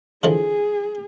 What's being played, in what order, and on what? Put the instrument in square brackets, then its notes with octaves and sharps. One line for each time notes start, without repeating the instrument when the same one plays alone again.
[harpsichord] D3 E3 F3 [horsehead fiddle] G#4